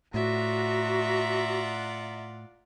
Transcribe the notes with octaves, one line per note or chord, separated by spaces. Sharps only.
A2 F4 F#4 D5 E5 F#5 A#5